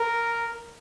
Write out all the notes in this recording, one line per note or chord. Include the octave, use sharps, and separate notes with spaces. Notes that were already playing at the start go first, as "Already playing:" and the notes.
Already playing: A#4